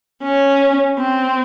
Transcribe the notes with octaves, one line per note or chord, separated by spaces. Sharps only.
C#4
C4